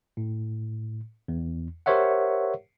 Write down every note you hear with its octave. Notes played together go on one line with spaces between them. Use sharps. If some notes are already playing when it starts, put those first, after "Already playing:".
A2
E2
G4 A#4 C5 C#5 E5 F#5